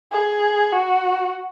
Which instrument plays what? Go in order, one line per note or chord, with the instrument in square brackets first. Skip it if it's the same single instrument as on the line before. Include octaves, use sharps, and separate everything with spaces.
[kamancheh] G#4
F#4